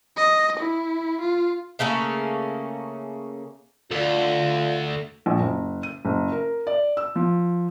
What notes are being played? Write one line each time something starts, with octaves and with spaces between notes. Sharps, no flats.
D#5
E4
F4
C#3 A3 A#3 C#4
D2 F4 A4 D5
A#1
F#1
D#7
F#1
A#4
D5
E6
F3